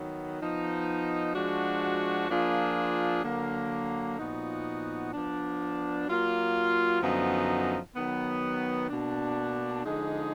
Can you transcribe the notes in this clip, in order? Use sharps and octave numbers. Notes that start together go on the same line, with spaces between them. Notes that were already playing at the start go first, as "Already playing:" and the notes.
Already playing: D#3 F#3 B3
F3 B3 D#4
F3 G#3 D4 F#4
F3 A#3 D4 F4 G#4
D3 F#3 A#3
A#2 F3 B3 D#4 F#4
F3 B3 D4
F#3 A#3 F4
F#2 D3 F3 B3 D#4
D#3 F#3 B3
B2 A#3 D4
D3 F3 G#3 D#4 G#4